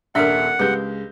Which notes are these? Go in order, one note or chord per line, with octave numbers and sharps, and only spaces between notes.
D#1 A#1 D4 A#4 E5 F#5
C#2 G#3 G4 B4 G6